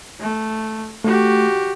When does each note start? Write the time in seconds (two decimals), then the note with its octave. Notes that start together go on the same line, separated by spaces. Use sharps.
0.20 A3
1.04 A3 F#4 G4